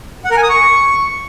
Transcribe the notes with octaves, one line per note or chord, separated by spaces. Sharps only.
F#5
A#4
G#5
D#6
C#6